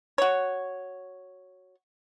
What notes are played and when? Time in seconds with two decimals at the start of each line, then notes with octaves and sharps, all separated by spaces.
0.18 F#4 C#5